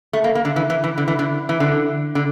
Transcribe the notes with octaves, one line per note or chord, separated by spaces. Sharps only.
A3
A#3
A#3
D3
E3
E3
E3
D3
E3
D3
E3
D3
D3